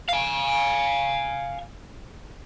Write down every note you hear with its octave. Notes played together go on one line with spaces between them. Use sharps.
F5 G#5